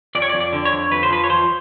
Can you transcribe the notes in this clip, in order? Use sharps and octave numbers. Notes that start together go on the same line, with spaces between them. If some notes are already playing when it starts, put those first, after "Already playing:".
F2 D5
C#5
D5
F2
D5
D3
C#5
F2
F2 B4
C5
F3 B4
C#5
F3 C5